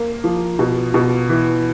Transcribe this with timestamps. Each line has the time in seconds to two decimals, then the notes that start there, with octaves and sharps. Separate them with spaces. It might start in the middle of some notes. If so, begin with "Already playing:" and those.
Already playing: A#3
0.24 F3
0.59 B2
0.94 B2
1.29 E3